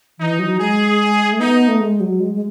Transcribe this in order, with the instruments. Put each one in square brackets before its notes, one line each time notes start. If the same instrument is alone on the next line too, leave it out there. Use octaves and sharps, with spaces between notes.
[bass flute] E3 [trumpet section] D#4
[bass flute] F#3
[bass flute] G#3 [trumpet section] G#4
[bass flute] A3
[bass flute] B3 [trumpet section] D#4
[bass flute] A3
G#3
F#3
G#3
G#3